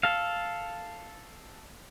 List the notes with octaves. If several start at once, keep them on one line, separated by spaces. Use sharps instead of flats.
A4 F5